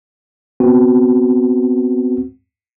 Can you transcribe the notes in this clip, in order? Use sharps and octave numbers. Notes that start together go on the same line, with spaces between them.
B3 C4 F#4